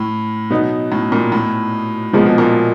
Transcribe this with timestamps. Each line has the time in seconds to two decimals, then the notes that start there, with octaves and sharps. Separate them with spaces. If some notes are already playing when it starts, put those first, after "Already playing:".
Already playing: A2
0.50 B2 F#3 B3 D#4
0.92 A2
1.12 A#2
1.32 A2
2.13 A#2 F3 G#3 B3
2.25 B2
2.38 A#2